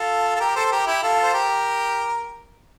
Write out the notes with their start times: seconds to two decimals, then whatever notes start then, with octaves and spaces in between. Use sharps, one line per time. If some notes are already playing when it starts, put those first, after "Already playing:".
Already playing: F4 A4
0.36 A4
0.40 G4 A#4
0.56 A4 C5
0.66 A4
0.72 G4 A#4
0.87 E4 G4
1.03 F4 A4
1.23 C5
1.34 G4 A#4